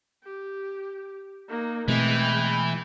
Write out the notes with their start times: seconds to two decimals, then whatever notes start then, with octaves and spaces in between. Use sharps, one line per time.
0.24 G4
1.49 A#3 D#4
1.88 B2 E3 G#3 A3 C4 G5